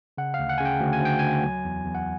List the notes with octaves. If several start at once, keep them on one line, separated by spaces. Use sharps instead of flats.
C#3 F#5
F5
D2
F#5
C#3 G#5
G5
D2
G#5
D2 G5
D2 G#5
F#3
E2
E2
F#5